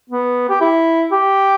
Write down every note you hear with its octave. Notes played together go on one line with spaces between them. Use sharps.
B3
G4
E4
G4